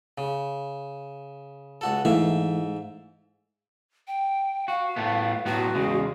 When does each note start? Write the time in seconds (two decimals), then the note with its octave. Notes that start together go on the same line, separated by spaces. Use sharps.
0.18 C#3
1.81 C#2 F#4 A4
2.05 G#2 E3 A3 E5 F5
4.07 G5
4.68 F#4 F5
4.96 A2 A3 B3
5.46 A2 F#3 B3 F#4
5.75 E2 C#3 G#3